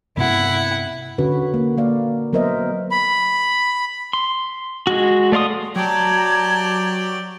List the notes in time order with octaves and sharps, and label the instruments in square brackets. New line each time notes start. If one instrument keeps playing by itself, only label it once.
[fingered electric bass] G2 C3 B3 [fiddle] E4 F#5
[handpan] D3 C#4 F#4 B4
A#3
A#3 D5 F5
F#3 B3 A#4 C5 D#5 E5
[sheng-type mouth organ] B5
[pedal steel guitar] C6
G#3 F#4
A3 D5 F5 C6 D#6
[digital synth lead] F#3 [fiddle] G4 D5 [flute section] A5 A#5 G#6